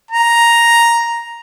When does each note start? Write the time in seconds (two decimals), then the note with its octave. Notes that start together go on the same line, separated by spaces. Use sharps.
0.11 A#5